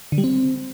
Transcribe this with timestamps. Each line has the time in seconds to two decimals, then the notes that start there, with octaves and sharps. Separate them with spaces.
0.12 D3
0.18 G3
0.24 C4